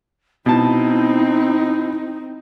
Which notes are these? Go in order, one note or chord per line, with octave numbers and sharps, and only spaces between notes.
B2 C4 D#4 E4 A5